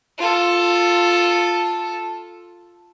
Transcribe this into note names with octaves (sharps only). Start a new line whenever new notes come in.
F4 A4